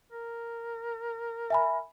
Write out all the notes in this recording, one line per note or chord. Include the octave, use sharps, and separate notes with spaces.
A#4
E5 G#5 B5